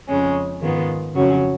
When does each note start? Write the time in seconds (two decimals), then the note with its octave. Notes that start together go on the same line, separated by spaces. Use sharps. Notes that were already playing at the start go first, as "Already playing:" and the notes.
0.08 F2 C#3 G#3 C#4
0.61 G#2 D#3 G#3 B3 F4
1.14 F2 C#3 F#3 C#4 F#4